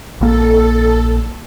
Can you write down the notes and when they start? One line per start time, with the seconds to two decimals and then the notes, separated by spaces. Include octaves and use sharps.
0.21 A#1 A#3 A4